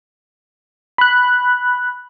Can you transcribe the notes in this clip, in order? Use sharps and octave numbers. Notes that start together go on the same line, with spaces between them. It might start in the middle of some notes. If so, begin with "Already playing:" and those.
B5 F#6